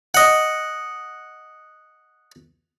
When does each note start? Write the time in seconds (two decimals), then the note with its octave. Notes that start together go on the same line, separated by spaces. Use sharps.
0.15 D#5 F#5